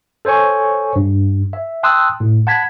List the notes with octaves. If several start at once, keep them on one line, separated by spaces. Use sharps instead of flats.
A4 C5 C#5 G#5 C#6
G2
E5
G5 A5 C6 D#6 E6 F#6
A2
F#5 A5 B5 G#6 B6